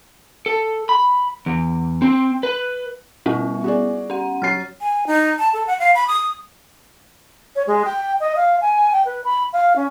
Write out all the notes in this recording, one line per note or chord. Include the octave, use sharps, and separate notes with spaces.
A4
B5
E2
C4
B4
B2 G3 B3 E4
F#4 G#4 D5
C#4 F#5
F#3 F6 A6 C7
G#5
D#4
A5
A4
F#5
F5
B5
D#6
C#5
G#3
G5
D#5
F5
G#5
G5
B4
B5
F5
C#4